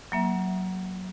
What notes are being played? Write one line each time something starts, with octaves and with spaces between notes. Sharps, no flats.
F#3 A#3 E5